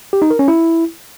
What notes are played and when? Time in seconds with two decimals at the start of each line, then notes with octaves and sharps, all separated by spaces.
0.13 G4
0.22 D#4
0.31 A#4
0.39 C#4
0.48 E4